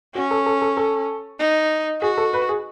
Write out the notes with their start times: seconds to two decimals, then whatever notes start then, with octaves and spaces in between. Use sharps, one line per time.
0.15 C#4 F#4
0.31 A4
0.46 A4
0.62 A4
0.77 A4
1.40 D#4
2.02 F#4 G#4
2.18 A4
2.33 B4
2.49 G#4